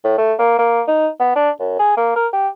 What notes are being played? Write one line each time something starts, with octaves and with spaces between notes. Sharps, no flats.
A2
A3
A#3
A#3
D#4
B3
D4
F#2
G#4
A#3
A#4
G4